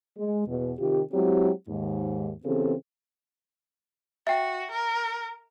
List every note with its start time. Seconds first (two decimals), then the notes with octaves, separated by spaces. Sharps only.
0.18 G#3
0.47 E2 B2
0.79 C3 D#3 F4 G4
1.13 F#3 G#3 C4 E4 G4
1.68 D#2 G#2 D#3
2.44 C#3 E3 B3 C4 G4 A4
4.27 F#4 E5 G5
4.71 A#4